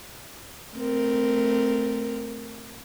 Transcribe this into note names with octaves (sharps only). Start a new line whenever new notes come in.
A3 C4 A#4